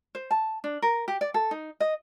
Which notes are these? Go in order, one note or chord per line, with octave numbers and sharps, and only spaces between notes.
C5
A5
D4
A#4
G4
D5
A4
D#4
D#5